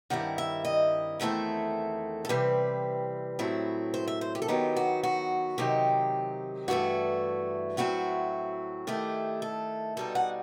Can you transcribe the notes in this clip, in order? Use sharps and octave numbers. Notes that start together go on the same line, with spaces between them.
G2 D#3 G3 C4 E4 F#5
E5
D#5
E2 D#3 A3 C4 E4 A4
A4
C3 E3 G3 C4 B4
A2 F#3 C4 E4
C5
E5
C5
G4
A4
D#3 F#3 B3 D#4 G4
F#4
F#4
C3 D#3 F#3 C4 D#4 G4
G2 E3 A3 E4 F#4
A2 F#3 C4 E4 F#4
D#3 A3 E4 G4
A4
B2 G3 D#4 A4
F#5